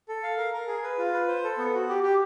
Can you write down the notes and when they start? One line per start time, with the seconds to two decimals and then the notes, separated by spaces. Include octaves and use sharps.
0.09 A4
0.23 F5
0.38 A#4
0.54 A#4
0.68 G#4
0.83 B4
0.99 F4
1.14 B4
1.28 C5
1.44 A4
1.58 B3
1.74 F#4
1.89 G4
2.03 G4